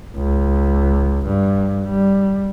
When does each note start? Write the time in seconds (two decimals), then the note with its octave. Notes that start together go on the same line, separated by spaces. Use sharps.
0.17 C#2
1.26 G2
1.86 G3